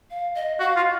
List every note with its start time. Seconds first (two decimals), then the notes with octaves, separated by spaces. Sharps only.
0.10 F5
0.35 D#5
0.60 F#4 F5
0.76 F4